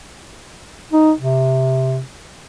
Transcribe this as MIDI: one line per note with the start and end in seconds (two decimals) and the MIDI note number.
0.92 1.12 63
1.18 2.00 48